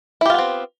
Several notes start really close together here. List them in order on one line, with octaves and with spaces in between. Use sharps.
E4 G4 F4 B3 C4